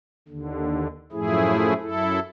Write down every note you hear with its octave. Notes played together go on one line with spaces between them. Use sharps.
D#2 D3
F#2 A2 F3 A3 E4 G#4
F#2 E4 A4